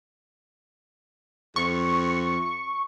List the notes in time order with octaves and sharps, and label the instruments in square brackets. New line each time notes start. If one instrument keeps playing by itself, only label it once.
[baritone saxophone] F2 [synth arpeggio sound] C#6